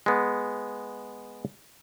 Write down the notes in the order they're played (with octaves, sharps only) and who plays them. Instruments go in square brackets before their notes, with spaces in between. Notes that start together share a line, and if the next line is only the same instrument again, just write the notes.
[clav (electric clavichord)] G#3 B3